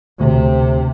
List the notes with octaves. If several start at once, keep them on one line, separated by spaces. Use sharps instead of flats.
D2 C3